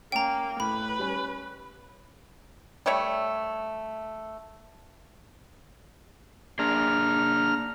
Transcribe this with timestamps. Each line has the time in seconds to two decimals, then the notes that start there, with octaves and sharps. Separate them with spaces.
0.12 A#3 C#4 G5 A#5
0.60 A2 B4 B5
0.99 G3 C#4
2.86 G3 A3 C#5 E5
6.59 A#3 D4 G#4 A#5 F6